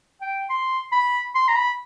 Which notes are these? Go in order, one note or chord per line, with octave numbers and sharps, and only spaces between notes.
G5
C6
B5
C6
A#5
B5